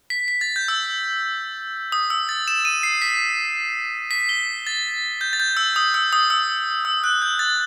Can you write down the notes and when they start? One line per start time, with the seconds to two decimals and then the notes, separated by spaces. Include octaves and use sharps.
0.10 B6
0.28 B6
0.41 A6
0.56 G6
0.68 E6
1.92 D#6
2.10 E6
2.29 A6
2.48 E7
2.65 D#7
2.83 C7
3.02 B6
4.11 B6
4.29 G7
4.67 A6
5.21 G6
5.33 A6
5.40 G6
5.57 E6
5.76 D#6
5.94 E6
6.13 D#6
6.30 E6
6.85 E6
7.04 F#6
7.22 G6
7.39 A6